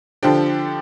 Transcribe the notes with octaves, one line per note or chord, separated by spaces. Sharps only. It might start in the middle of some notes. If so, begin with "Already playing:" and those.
D3 F3 D4 G4